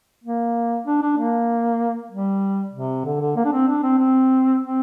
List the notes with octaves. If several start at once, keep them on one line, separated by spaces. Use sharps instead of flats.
A#3
D4
D4
A#3
G3
C3
D3
D3
A#3
D4
C4
D4
C4
C4
C4